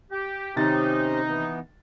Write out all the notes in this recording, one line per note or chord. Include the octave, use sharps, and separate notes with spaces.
G4
C3 D#3 C#4 D#4 G4 C5 A6
E3 B3